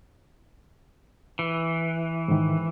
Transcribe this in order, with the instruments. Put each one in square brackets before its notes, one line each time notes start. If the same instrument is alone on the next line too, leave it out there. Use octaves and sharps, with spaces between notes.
[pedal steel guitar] E3
[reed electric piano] G#2 D#3